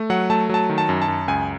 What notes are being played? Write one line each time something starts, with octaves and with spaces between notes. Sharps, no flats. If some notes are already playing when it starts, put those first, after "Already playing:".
Already playing: A3
F#3 F#5
A3 A5
F#3 A5
D#3
A5
F#2
A5
F#2
C#2 G#5